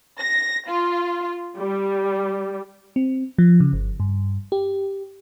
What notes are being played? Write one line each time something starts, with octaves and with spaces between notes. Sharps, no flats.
A#6
F4
G3
C4
F3
C#3
G1
G2
G4